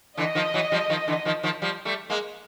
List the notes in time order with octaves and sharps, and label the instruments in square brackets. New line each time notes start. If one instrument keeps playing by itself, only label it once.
[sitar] D3 E3 [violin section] D#5
[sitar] D#3 F3
E3 F#3
F3 G3
D#3 F3
D3 E3
D#3 F3
D#3 F3
F3 G3
G3 A3
G#3 A#3